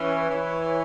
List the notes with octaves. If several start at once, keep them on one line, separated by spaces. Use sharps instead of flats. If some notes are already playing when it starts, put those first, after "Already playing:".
Already playing: E3 C#4 B4 C#5
E3